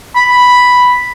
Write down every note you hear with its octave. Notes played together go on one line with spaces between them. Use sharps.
B5